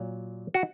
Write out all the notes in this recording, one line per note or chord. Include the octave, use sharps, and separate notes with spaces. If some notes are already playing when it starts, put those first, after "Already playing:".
Already playing: A#2 F#3
F#4